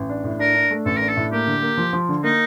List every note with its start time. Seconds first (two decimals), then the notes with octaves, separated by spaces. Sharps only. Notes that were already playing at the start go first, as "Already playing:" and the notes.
Already playing: A1
0.09 D4
0.24 A2
0.39 D4 A#4
0.55 D4
0.70 A3
0.85 A1 A4
0.97 D4 A#4
1.09 A4
1.17 A2
1.32 A#3 G4
1.47 D3
1.62 A#3
1.77 F3
1.93 F3
2.09 D3
2.23 A#3 D#4